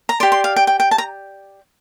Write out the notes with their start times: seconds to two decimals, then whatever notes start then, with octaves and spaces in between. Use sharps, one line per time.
0.09 A#5
0.20 G4 D5 C6
0.32 C6
0.44 F5
0.56 G5
0.67 G5
0.80 G5
0.91 A5
0.98 A#5